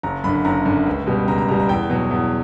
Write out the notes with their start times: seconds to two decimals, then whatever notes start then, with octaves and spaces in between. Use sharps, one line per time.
0.03 F#1 A#5
0.24 F#2 B5
0.27 D3
0.45 F#1 A#5
0.65 F#2 D3
0.86 C#2
1.07 B2 G3
1.27 C#2 A#5
1.38 A#5
1.49 B2 G3 A#5
1.59 A#5
1.69 E2 G5
1.90 B2 F#3
2.11 E2